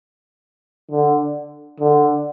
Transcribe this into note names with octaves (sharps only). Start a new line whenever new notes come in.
D3
D3